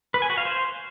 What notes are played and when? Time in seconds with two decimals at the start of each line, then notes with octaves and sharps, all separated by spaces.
0.14 B4
0.22 G#5
0.30 F#4
0.38 F5
0.45 C5